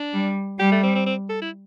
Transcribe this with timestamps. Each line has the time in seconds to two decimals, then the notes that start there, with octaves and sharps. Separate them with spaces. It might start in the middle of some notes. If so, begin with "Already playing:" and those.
Already playing: D4
0.14 G3
0.59 G3 G4
0.72 A3
0.83 C4
0.95 C4
1.06 C4
1.29 A4
1.41 E4